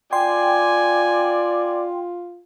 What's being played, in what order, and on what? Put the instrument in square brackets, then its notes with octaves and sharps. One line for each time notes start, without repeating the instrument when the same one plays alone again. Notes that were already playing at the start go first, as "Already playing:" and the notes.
[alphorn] F4 [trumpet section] D5 [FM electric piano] G5 C6 [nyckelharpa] G#5